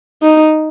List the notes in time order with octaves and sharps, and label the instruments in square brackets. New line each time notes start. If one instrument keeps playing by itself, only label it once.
[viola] D#4